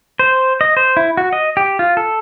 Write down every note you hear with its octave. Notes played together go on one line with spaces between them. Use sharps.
C5
D#5
C5
E4
F#4
D#5
G4
F4
A4